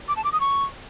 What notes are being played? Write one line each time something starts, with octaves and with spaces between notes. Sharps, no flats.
D6
A5
D6
D#6
C#6